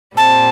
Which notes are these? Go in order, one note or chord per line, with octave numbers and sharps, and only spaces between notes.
A#2 G3 C4 A5